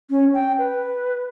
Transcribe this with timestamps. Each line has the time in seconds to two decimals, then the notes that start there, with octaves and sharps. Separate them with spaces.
0.10 C#4
0.34 G5
0.59 B4